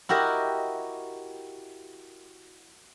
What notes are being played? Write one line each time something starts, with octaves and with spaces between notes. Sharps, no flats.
E4 F#4 G4 A#4 D#5